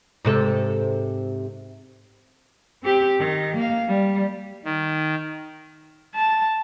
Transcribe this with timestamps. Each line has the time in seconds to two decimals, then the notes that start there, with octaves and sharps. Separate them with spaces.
0.25 G#2 C3 A4
2.83 C4 G4
3.20 D#3
3.57 A#3 F5
3.88 G3
4.65 D#3
6.15 A5